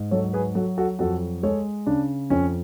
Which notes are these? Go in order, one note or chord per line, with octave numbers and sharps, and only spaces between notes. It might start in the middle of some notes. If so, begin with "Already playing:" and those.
Already playing: G#2
F#3 A4 C#5
G#4 B4
F#3 F#4 A4
F#4 A4
F2 F#4 A4
G#3 A4 C#5
C#3 D4
F2 C#4